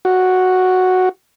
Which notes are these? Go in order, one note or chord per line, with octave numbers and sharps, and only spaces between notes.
F#4